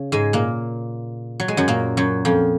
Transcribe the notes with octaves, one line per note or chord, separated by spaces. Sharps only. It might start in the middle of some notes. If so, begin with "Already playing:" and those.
Already playing: C#3
G#2 G#3
A#2 A#3
F#3
G#3
F#2 F#3
A#2 A#3
F#2 F#3
F2 F3